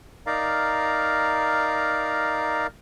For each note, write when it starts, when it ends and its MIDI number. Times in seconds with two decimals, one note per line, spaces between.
0.27 2.67 63
0.27 2.67 70
0.27 2.67 74
0.27 2.67 77
0.27 2.67 82